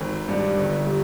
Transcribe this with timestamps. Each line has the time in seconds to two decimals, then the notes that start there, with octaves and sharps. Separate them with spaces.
0.01 G#1
0.29 G2 G3
0.57 G1
0.86 G3